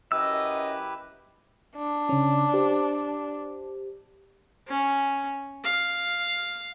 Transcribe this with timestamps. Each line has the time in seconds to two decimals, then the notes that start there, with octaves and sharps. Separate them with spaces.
0.12 F#2 E4 G4 B4 D#5 E6
1.76 D4
2.09 C#3 C#4
2.54 G4 C5
4.67 C#4
5.64 F5